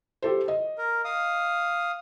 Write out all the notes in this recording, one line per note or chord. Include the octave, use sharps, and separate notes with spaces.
G4 A4 C5
D#5
A#4
F5 D#6